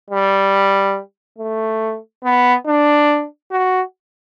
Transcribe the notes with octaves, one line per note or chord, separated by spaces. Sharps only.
G3
A3
B3
D4
F#4